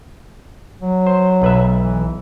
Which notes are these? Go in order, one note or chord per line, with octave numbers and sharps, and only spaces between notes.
F#3
C5
B1 B4 E5
E3